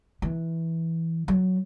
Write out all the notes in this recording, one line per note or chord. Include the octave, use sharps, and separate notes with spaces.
E3
F#3